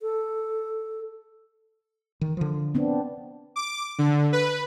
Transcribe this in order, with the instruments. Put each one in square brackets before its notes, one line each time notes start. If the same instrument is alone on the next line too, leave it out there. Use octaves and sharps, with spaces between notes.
[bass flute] A4
[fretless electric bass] D#3
D3 F3
[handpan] B3 C4 D4
[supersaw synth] D6
D3
B4